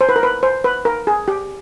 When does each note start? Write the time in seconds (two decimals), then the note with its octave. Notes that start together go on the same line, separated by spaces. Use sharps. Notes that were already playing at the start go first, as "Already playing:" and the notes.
0.01 C5
0.09 B4
0.16 A#4
0.23 B4
0.43 C5
0.64 B4
0.85 A#4
1.07 G#4
1.28 G4